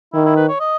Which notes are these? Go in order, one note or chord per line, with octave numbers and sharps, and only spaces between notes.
D#3 E4
E4
B4
C#5
D#5